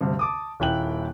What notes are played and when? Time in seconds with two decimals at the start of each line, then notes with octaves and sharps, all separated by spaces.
0.01 D2 G2 C3
0.19 A5 D6 D#6
0.60 D#1 A#3 E4 G5 F#6 F#7